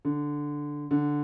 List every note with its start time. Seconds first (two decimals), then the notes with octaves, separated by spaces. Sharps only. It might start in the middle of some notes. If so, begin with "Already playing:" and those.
0.05 D3
0.91 D3